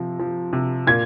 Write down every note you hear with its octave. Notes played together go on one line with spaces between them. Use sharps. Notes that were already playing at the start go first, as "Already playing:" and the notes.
Already playing: C3 F3
F3
C3
A#2 G#6